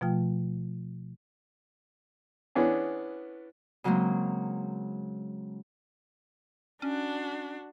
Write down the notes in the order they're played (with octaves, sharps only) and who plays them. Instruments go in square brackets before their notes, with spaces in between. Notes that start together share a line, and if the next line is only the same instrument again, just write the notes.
[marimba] B2 F3 A3 F4 G5
[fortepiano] E3 B3 C#4 D4 G#4
[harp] C#3 F#3 G#3 A#3 C4
[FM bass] C#4 [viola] D4 F#4